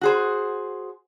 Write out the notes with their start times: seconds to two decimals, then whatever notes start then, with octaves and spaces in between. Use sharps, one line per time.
0.01 F#4 G#4 C5